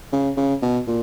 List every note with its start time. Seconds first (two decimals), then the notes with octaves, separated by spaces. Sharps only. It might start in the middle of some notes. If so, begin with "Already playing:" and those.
0.13 C#3
0.37 C#3
0.62 B2
0.87 A#2